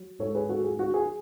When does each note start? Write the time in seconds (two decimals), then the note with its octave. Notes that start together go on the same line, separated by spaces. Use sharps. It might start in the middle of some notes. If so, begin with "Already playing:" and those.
Already playing: F#3
0.19 G#2 A4 C#5
0.35 G#4 B4
0.49 F#3 F#4 A4
0.64 G#4
0.79 F#3 F#4
0.94 G#4